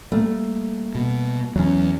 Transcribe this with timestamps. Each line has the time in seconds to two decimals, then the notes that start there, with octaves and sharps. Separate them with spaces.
0.12 G3 A3 A#3
0.95 B2
1.56 E2 F#3 C#4